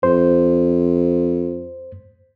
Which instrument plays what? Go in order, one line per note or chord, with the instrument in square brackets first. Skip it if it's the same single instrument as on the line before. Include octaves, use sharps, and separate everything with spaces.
[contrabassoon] F2 [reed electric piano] C5